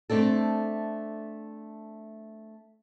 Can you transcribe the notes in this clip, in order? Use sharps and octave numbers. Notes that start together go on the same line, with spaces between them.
A3 C4 D4 A4